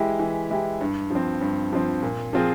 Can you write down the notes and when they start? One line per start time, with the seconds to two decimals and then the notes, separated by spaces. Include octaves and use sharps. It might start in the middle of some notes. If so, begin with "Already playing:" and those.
Already playing: E3 G#3 E4 G4
0.19 E3
0.50 G#3 E4 G4
0.81 G2
1.10 F3 C4
1.41 G2
1.73 F3 C4
2.02 A#2
2.33 F3 C4 F4 G#4